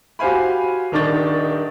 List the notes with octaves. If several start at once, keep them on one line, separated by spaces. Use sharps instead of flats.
F#4 G4 C5 F5 G#5 B5
D#1 D#3 D4 D#4 C#6 A6